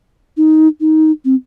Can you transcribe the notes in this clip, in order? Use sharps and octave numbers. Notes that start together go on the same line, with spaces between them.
D#4
D#4
C4